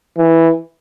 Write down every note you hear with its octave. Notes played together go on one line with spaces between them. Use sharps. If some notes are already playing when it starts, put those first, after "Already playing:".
E3